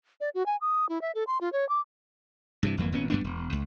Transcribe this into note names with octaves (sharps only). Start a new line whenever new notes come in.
D5
F#4
G#5
D#6
E4
E5
A4
C6
F4
C#5
D6
G2 C3 E3
G1 F2 E3 A#3
G#1 A#2 B3 C#4
G2 G3 B3 D4
E1
C#2